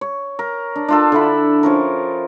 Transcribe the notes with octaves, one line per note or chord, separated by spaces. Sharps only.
C#5
A#4
D4
D4 F4 A4
D3 D4 E4 B5
F3 C#4 A#4